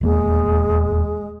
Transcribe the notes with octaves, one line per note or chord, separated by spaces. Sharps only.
D#1 E2 G#3 A#3